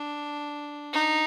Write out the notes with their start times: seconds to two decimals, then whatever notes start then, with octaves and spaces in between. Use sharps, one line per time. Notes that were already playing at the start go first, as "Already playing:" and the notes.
Already playing: D4
0.93 D#4